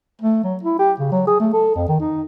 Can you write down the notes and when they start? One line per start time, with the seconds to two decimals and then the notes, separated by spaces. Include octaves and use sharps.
0.21 A3
0.44 F#3
0.63 E4
0.79 G4
1.00 C#3
1.12 F#3
1.27 G#4
1.40 A3
1.53 A4
1.75 F2
1.88 D#3
2.00 D#4